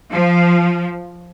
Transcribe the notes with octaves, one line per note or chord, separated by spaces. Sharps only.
F3